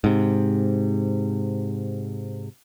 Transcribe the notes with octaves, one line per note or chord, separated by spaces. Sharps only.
G#2 C3